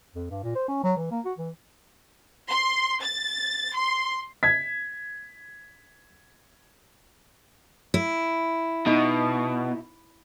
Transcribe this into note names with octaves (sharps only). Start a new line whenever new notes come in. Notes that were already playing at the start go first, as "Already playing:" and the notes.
F2
G2
A#2
C5
C#4
F#3
E3
A#3
F#4
E3
C6
A6
C6
G#6 B6
E4
B2 D#4